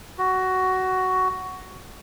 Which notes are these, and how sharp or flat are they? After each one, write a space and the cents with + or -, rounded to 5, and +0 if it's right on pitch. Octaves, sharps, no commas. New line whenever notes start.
F#4 +10